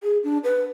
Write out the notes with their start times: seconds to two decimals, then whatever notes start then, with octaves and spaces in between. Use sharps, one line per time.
0.03 G#4
0.24 D4
0.44 B4